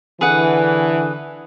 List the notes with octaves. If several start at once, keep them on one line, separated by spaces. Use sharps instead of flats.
D3 E3 G#4 B4 F#5